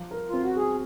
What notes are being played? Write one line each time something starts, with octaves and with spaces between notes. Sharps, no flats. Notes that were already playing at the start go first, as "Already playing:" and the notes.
Already playing: F3
A#4
C4 F4
F#4
F#4 G#4